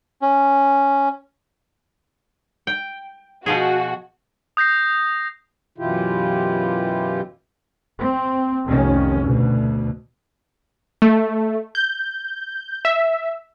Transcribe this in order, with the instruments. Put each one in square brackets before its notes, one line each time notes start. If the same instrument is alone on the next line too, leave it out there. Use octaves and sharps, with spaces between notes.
[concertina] C#4
[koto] G5
[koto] B2 F3 G#4 [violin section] F#4
[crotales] D#6 G6 A#6 C7
[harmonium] F#2 B2 E3 E4 F4 G4
[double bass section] C4
F1 C2 D#3 C#4
D2 B2
[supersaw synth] A3
G6
E5